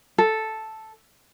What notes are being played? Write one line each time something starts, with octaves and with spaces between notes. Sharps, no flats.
A4